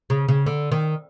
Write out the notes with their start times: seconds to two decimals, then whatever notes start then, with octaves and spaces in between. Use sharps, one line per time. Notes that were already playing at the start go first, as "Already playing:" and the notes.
0.10 C#3
0.28 C#3
0.46 D3
0.72 D#3